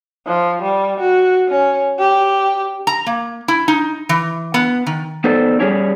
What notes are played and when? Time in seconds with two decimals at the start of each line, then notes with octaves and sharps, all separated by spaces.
0.27 F3
0.62 G3
1.00 F#4
1.49 C#4
1.99 G4
2.87 A#5
3.06 A#3
3.48 E4
3.68 D#4
4.09 E3
4.54 B3
4.87 D#3
5.24 B3 D#4 A4 C5 D5
5.59 G3 C#4 G4 G#4 C#5 D5